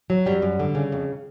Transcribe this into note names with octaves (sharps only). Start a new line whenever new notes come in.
F#3
F#2 G3
F#2
D3
C#3
F2